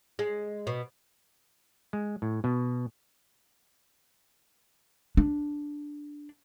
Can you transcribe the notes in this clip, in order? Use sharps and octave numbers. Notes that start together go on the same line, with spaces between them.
G#3
B2
G#3
A2
B2
D4